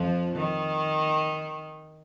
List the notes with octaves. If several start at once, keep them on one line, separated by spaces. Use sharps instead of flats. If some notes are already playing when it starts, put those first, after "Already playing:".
Already playing: F2 F3
D#3